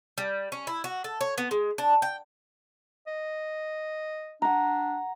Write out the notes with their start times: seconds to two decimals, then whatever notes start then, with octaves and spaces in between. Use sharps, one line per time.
0.18 G3
0.52 C#4
0.67 E4
0.84 F#4
1.04 A4
1.21 C#5
1.38 B3
1.51 G#3
1.78 D4
2.02 G5
3.07 D#5
4.42 D4 F#5 A#5